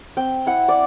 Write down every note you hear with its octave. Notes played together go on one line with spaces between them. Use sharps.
C4 G5
E4 F#5
D5